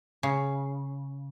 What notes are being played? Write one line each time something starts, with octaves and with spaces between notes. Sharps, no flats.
C#3